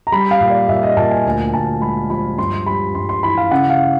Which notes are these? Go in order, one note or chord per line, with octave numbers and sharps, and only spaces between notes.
A#5
G3 B5
F5
A#2
D5
A#2 E5
D#5
A#2 A5
G#5
D2 G#5
D2 A5
G#3 B5
F3 B5
G2 C6
G3 B5
G2 C6
C6
E3 B5
F5
C#3 F#5
F5